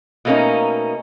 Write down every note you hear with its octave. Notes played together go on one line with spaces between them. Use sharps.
B2 A3 A#3 C4 C#4 D#4